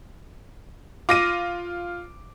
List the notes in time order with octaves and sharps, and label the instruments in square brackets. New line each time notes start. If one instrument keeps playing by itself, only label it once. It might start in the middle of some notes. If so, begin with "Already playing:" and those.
[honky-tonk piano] F4 A#6 D#7 [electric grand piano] D6